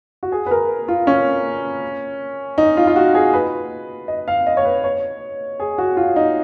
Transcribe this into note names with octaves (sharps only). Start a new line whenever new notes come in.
F#4
G#4
B4
A#4
F4
C#4
D#4
F4
F4
F#4
G#4
B4
D#5
F5
D#5
C#5
B4
C#5
G#4
F#4
F4
D#4